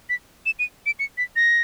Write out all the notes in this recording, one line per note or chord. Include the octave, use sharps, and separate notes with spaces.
B6
E7
D#7
D7
C#7
B6
A#6